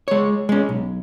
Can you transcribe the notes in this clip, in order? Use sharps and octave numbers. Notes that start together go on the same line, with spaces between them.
G#3 C#5
G#3 C#4
B1